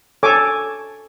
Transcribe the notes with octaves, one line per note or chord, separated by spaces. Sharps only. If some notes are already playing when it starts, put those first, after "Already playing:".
A4 C#5 G#5 D6